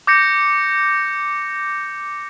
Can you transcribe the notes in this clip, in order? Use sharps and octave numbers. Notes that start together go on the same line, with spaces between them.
D6 G6 A#6 C#7